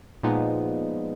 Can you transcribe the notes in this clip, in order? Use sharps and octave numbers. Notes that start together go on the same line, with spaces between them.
A#2 F3 G#3 B3 D#4